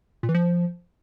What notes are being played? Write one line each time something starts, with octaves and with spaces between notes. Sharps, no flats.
A#2
E3
F3